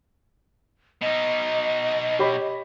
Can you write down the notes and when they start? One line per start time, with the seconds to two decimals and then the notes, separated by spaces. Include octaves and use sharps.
1.02 B2 D#4 D#5
2.19 G4 C#5 B5